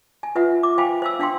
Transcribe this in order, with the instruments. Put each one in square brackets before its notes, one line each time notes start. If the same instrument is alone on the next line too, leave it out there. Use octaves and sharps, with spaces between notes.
[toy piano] G#5
F4 B4 E5 F#5
D6
C5 F5 G5 G#5 B5
C5 F5 E6
D4 F5 G5 C6